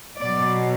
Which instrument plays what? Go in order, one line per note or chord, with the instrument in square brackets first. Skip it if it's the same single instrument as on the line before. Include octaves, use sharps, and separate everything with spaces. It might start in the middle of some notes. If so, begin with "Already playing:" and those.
[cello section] B2 F#3 D5